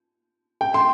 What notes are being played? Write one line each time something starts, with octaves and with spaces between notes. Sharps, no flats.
G5
C6